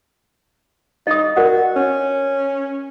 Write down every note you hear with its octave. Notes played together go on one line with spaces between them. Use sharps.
D#4 D#5 D#6
F#4 A#4 D5 F#5
C#4